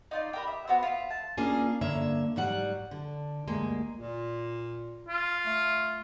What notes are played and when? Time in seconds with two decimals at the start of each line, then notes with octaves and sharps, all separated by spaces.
0.11 D#4 F4 D5
0.33 G4 A#4 B5
0.47 E5
0.68 B3 F#4 C5 E6
0.83 F4 E5
1.10 A5
1.37 A#3 C#4 D4 F4 G#4
1.81 G2 D3 A#3 C#5 E5
2.36 G#2 F#3 G3 F#5
2.91 D3
3.48 D2 G2 G#3 A#3
3.98 A#2
5.09 F4
5.46 A3